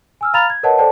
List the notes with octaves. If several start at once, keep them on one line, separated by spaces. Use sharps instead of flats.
G#5 E6 F6
F5 A#5 B5 F6 A6 F7
G#6
A#4 B4 C#5 D#5 F#5 A5
A4 C5 D5 G5 A5